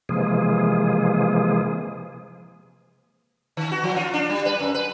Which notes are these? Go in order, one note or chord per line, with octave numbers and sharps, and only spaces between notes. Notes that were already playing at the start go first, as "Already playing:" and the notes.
C3 E3 F3 G#3 A#3 G#4
D#3
F#4
F3
F4
D4
G3
B4
F#2
B4